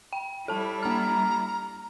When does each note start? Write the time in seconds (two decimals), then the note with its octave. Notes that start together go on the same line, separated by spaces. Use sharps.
0.13 G5
0.48 G3 E4 A4 A5
0.83 A#3 A#5 F6